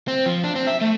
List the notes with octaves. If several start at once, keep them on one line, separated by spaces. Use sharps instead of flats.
C4
F3
D4
C4
E5
A3